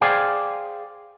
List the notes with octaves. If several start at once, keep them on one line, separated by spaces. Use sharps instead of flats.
G#4 C5 D5 F5 G5 G#5